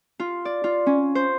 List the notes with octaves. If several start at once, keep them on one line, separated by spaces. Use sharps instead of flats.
F4
D5
F4
C#4
C5